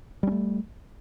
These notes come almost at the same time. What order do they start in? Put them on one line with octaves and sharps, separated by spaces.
G3 C#4 A3